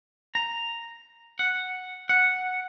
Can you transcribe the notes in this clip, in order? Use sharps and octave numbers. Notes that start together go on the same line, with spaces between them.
A#5
F#5
F#5